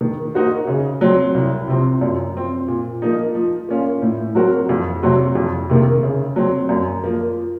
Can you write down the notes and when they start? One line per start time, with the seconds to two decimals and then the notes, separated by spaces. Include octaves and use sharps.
0.01 D#3
0.34 A#3 D#4 F#4 C5
0.67 C#3
1.01 F#3 C4
1.35 C2
1.68 C3 F3 C4
2.01 F#2
2.35 F3 C4
2.68 A#2
3.02 F3 A#3 D#4
3.35 F3
3.69 A#3 C#4 F4
4.02 A2
4.35 F#3 C4 F#4 A#4
4.69 F2
5.03 C3 F#3 C4 F#4
5.35 F2
5.69 C3 D#3 A#3
6.03 C#3
6.36 F#3 C4
6.69 F#2
7.04 F3 A#3